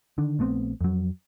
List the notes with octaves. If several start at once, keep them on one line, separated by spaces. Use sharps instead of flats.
D3 D#3 D4
A#1 A3 B3 C4
F2 F#3